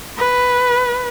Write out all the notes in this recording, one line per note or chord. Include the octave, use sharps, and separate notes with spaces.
B4